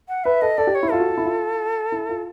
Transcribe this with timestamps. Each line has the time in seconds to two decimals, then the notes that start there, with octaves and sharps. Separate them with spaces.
0.09 F#5
0.24 B4 E5
0.41 A4 D#5
0.58 A4 D5
0.67 G4
0.75 C#5
0.83 E4
0.91 F4 A4
1.00 F#4
1.08 F4
1.17 E4
1.25 F4
1.92 E4
2.09 F4